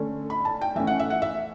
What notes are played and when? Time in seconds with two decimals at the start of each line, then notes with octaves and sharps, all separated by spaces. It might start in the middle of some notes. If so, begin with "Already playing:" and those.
Already playing: D3 A3 C#4
0.30 B5
0.45 A5
0.61 G5
0.76 E3 A3 C#4 E5
0.87 F#5
1.00 E5
1.10 F#5
1.22 E5